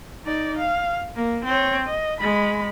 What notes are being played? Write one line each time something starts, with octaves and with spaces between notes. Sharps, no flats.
D#4 D5
F5
A#3
C4 C#5
D#5
G#3 B5